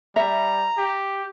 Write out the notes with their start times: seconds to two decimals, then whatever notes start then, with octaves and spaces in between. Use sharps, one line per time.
0.16 G3 E5 A#5
0.78 G4